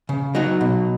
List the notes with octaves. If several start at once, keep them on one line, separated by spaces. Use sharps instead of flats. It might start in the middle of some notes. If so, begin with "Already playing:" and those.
C#3
F#3 D#4 F#4
B2